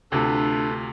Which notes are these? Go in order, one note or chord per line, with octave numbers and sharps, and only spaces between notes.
D2 C3 A3 D4 F4 A4 B4